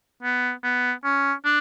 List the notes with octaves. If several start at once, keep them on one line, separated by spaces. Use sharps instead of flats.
B3
B3
C#4
D4